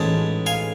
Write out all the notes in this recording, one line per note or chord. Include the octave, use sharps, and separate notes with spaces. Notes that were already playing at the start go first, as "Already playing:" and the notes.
Already playing: A1 G#2 G#3 C#4 A5
F5 G#5